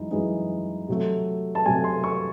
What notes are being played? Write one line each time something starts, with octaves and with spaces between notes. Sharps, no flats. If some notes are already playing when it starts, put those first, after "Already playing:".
Already playing: F#2 E3 G#3 D#4
F#2 E3 G#3 D#4
C3 F#3 A3
A5
C3 F#3 A3 G#5
C6
C#6